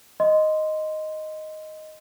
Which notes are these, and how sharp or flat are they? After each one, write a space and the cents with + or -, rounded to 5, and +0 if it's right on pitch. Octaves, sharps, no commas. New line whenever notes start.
D#5 +0 C6 -10